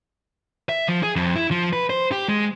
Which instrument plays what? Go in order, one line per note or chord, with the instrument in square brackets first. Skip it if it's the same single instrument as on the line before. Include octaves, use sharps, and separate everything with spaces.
[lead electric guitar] E5
F3
G#4
F2
E4
F3
B4
C5
G4
G#3